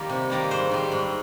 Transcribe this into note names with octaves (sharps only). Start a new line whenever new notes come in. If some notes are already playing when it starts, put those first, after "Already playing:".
Already playing: D#3 G3 A#3
C3
D#3 G3 A#3
G#2 C5
D#3 G3
G#2